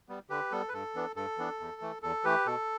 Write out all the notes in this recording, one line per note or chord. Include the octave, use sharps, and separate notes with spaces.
G3 B3
D3 G4 B4
G3 B3 A4
B4
G2 A4
E3 B3 D4
G2 A4
E3 B3 D4
E2
E3 A3
E2 A4
E3 A3 G4 B4
B2 A4